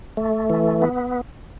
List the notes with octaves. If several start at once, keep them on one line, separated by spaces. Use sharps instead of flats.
A3
E3
B3